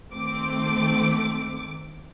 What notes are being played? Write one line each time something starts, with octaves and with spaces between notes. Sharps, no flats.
D#3 A3 C4 D6